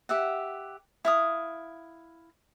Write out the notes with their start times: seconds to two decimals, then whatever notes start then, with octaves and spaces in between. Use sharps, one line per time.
0.09 G4 E5 F#5
1.05 E4 F5 D#6